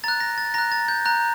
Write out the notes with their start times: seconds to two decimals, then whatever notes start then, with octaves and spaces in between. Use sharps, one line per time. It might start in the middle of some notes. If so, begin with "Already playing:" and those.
0.04 A#5 F#6 A6
0.20 A#6
0.38 A6
0.54 A#5 F#6 A#6
0.72 A6
0.88 G6
1.05 A#5 F#6